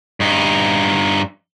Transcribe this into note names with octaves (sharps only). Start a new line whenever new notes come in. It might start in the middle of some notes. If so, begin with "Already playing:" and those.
G2 D#4